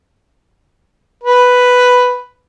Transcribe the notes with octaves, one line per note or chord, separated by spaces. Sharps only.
B4